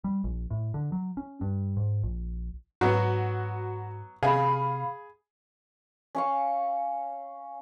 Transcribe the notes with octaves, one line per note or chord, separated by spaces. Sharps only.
G3
A#1
A2
D3
F#3
C#4
G2
G#2
A#1
G#2 F#3 B3 F#4
C3 G#4 F5 B5
C#4 F5 C#6